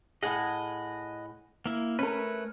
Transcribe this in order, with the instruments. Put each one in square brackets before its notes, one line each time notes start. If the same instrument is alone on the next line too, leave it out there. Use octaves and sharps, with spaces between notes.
[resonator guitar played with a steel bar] A2 G#4 [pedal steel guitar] D#5 F#5
[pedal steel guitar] A#3 E4
[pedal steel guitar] A3 B4 [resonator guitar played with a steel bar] C#4 A#4